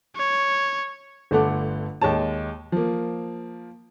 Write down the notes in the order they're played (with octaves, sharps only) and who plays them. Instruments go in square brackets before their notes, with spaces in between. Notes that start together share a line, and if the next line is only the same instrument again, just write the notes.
[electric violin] C#5
[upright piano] G1 D3 A3 A4 F#5 D6
D#2 G#3 C#5 A5
F3 A#3